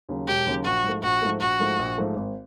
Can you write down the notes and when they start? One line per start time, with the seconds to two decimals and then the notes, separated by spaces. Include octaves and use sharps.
0.09 D#2 C#3 F#3
0.27 E1 G4
0.46 D#2 C#3 F#3
0.65 A#1 F#4
0.84 G#2 F3 A3
1.03 A#1 F#4
1.22 G#2 F3 A3
1.41 A#1 F#4
1.60 G#2 F3 A3
1.79 A#1
1.98 G#2 F3 A3
2.16 G#1